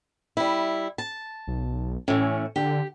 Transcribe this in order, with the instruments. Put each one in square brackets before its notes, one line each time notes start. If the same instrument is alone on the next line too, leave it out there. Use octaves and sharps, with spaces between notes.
[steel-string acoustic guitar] G3 E4
A5
[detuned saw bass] B1
[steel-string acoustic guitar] A2 E3 [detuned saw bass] C#4
[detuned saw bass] D3 [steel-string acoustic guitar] G4